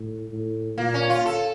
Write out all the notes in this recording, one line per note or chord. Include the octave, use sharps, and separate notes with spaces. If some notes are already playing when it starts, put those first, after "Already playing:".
Already playing: A2
A2
A#2 A#3
C#4
F4
A4